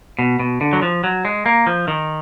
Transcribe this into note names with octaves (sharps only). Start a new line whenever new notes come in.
B2
B2
D3
F#3
F3
F#3
G#3
A#3
F3
D#3